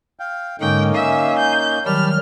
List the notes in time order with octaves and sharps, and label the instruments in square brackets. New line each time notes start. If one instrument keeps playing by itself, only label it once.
[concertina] F5 G5
[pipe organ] G#2 D3 G#3 [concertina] A#3 C#4 D#4 [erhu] G5
[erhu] E5 [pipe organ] F5 G#5
[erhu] G6
[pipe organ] D#3 F#3 G3 [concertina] G4 A5 B5 [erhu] F6